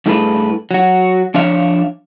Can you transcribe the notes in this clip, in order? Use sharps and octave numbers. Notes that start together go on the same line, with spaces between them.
G2 A3 E4 G#4 A4 B4
F#3 F#4
F3 D4 C#5 E5 F5